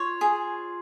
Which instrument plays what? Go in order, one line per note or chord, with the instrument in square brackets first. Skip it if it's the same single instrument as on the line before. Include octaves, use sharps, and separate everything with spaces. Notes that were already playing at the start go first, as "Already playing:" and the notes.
Already playing: [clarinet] F4 [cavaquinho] C#5
[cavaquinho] G#4